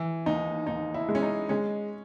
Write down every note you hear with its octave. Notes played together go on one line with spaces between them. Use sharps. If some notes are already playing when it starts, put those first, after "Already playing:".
Already playing: E3
D#2 D#4
D#2 D#4
E4
G#3
C#4
D#4
G#3 C#4